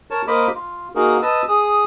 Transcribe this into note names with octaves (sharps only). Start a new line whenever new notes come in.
A#4 C#5 A5
A#3 A#4 C5 D#5 B5 D6
F4
A#3 D#4 F#4 G#4 A#4
B4 D#5 A5 E6
G#4 D#6